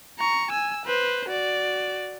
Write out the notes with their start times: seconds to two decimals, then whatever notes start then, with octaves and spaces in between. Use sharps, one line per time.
0.19 A#5 C#6
0.51 G#5 E6
0.86 B4 C5
1.29 F#4 D5